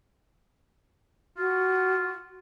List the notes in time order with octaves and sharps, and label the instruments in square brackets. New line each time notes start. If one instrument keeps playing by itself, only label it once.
[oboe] F4 [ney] F#4